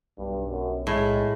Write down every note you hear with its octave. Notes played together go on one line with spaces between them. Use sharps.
B1 G2
F#2
A2 G#3